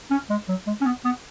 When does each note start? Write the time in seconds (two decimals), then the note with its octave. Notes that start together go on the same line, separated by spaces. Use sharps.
0.11 C#4
0.30 G#3
0.49 F#3
0.67 G#3
0.81 C#4
0.86 B3
1.05 B3